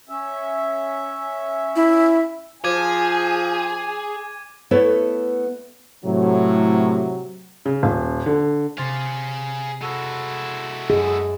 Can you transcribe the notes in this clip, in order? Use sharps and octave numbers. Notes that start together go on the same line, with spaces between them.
C#4 E5
E4
F3 G#4 G#5 D6 G#6 D#7
A3 B3 E4 A4 B4 C#5
A2 C3 F#3
C#3
D#1
D3
C3 G#4 F5 C6 A6
G#3 E4 F#4 A4
F#2 G#4 D#5